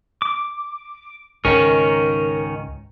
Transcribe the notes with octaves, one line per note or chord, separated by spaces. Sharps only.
D6
C#2 G#2 D#3 C#4 A#4